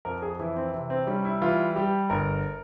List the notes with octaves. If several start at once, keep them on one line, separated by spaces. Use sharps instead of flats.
F2 A#4
G#4
E3 E4
C4
C3
C4
G3 C#4
E4
E3 F4
G3 G4
G1 A#4